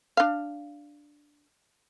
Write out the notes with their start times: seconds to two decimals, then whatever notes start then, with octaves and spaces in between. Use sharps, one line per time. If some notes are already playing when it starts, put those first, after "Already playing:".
0.17 D4 F5